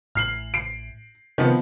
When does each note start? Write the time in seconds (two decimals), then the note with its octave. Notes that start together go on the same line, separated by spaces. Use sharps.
0.15 A1 A2 F6 C7 F#7
0.54 C7 D7
1.38 C3 D#3 F3 B3